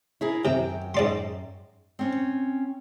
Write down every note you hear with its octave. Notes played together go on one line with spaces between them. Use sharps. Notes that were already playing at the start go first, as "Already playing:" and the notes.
E4 G#4 A#4
F#2 C3 G5
G#2 D5 C6
C4 C#4